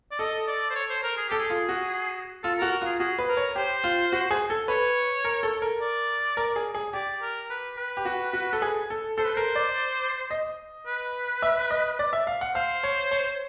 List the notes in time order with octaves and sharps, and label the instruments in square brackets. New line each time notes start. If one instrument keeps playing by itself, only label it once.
[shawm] D5
[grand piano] A4 [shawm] D#5
[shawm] D5
C5
C#5
C5
A#4
G#4
[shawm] G4 [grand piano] A4
[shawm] G#4
[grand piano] F4
F#4
[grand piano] F4 [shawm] A4
[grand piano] F#4 [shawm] A#4
[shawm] A#4
[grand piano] F4 [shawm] G#4
[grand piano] F#4 [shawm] G#4
[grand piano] B4
[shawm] A#4
[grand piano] C#5
[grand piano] G4 [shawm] C5
[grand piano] F4
F#4
G#4
A4
[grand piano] B4 [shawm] C#5
[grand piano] A#4
A4
A#4
[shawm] D5
[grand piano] A#4
G#4
G#4
[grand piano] G4 [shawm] D5
[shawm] A#4
B4
B4
[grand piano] G4
F#4
F#4
A4
G#4
A4
[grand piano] A4 [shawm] C5
[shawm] B4
[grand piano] A#4 [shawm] C5
[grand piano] D5
D#5
[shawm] B4
[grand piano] E5
D#5
D5
E5
F5
F#5
[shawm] C5 [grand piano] F5
[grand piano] C#5
C#5